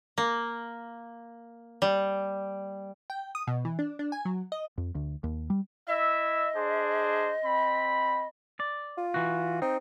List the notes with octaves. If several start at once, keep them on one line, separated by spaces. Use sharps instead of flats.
A#3
G3
G5
D#6
B2
E3
D4
D4
G#5
F#3
D#5
F2
D2
D#2
G3
E4 D#5 E5
D4 G#4 C5
C4 B5
D5
F4
E3 F#4
C4 D#4